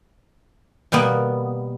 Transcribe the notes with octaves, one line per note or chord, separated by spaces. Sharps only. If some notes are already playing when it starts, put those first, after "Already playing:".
B2 G3 A#3 B3